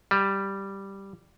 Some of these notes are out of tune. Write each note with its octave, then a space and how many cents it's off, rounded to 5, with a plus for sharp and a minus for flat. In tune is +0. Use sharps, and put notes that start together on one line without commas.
G3 +0